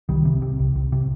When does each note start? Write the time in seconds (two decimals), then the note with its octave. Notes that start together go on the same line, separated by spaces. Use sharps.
0.09 C2 D#3 G3
0.25 C3
0.42 C3
0.59 C2
0.76 C2
0.92 C3